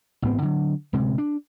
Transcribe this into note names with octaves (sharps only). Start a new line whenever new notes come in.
A1 G#2 B3 C4
D3 F#3
D1 C3 G#3
D4